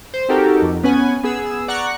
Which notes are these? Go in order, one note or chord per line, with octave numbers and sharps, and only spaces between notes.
C5
C4 D#4 F#4 G4 A4 A#4
F2
B3 C#4 B4 F#5 G#5
B3 G#4 E6
D5 F#5 A#5 C#6 F#6 C#7